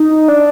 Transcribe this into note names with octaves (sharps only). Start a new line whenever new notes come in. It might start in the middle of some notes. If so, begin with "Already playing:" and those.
Already playing: D#4
D4